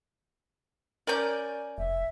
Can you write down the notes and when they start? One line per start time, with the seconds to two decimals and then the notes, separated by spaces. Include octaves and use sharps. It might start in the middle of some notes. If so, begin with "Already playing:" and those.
1.07 C#4 A#4 D5 G#5 G6
1.78 F1 E5